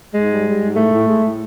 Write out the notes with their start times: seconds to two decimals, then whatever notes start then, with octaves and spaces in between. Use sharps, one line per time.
0.14 G#2 G#3
0.30 G3
0.46 G3
0.61 G#2
0.76 A2 A3
0.93 A2
1.08 G#3
1.24 A2